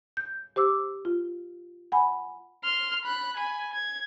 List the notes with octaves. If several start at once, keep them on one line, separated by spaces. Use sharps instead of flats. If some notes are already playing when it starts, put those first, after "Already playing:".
G6
G4 C5 D6 E6
F4
F#5 G#5 B5
C6 F6
B5 F#6
G#5 B5
G#6